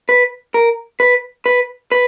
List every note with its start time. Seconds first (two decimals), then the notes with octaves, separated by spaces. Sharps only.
0.09 B4
0.54 A#4
1.00 B4
1.46 B4
1.92 B4